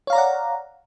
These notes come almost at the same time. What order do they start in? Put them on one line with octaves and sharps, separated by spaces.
C#5 F5 A#5 D5 F#5